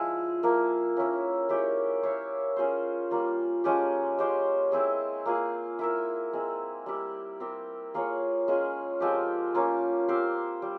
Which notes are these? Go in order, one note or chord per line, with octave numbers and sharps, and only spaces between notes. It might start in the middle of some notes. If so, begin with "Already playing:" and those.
Already playing: F3 G#3 E4 G#4
F3 A#3 E4 A#4
A#3 C#4 E4 A#4
G#3 E4 G4 C#5
E4 A#4 C#5 F5
C#4 F4 G#4 C5
G3 A#3 F4
F3 G#3 C#4 G4
G#3 C#4 G4 C5
C4 E4 G#4
A#3 F4 G#4
E4 A#4 E5
G#3 C4 E4
G3 A#3 E4 G4
C4 G4 A#4
A#3 F4 G#4 C#5
G#3 C#4 F4 G#4
F3 G#3 C4 G4
A#3 C#4 F4
C4 G4 C5 F5
G3